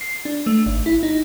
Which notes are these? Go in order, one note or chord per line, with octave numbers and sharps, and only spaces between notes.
C7
D4
A3
G#1
E4
D#4